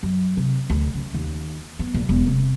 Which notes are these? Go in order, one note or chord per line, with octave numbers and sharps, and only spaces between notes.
F#2
C3
D2
C#3
D#2
B3
A#1
E1
C3